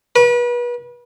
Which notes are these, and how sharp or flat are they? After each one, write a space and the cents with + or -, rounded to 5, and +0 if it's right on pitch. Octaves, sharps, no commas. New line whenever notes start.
B4 -35